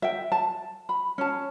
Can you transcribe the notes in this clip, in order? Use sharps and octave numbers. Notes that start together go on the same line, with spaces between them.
E5 G5
A5
B5
C#4 A5